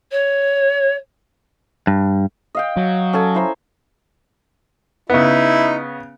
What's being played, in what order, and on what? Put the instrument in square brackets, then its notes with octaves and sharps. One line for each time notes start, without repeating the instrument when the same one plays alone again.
[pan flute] C#5
[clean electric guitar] G2
[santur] D#5 F5 G5
[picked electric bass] F#3
[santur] C#4 A4 G#5
E4 C5 A#5
[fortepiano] C#3 B3 [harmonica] D#4 E4